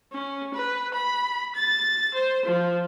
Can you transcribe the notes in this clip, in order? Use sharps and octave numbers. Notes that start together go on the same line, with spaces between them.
C#4
B4
B5
A6
C5
F3